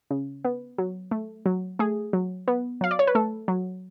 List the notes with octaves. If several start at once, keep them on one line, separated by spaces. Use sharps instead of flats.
C#3
B3
F#3
A3
F#3
A3 G#4
F#3
B3
F#3 F5
D5
C#5
B4
A3 A4
F#3